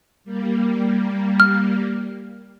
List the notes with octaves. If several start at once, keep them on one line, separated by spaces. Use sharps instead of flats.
G3 A#3
F6